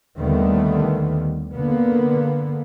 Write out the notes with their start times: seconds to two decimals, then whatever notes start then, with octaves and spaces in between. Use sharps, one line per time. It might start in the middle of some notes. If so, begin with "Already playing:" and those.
0.17 D#2 D3 D#3 G3 A3 B3
1.54 D3 A#3 B3